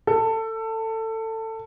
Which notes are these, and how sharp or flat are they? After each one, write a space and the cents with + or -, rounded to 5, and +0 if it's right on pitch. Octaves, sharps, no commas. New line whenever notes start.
A4 +20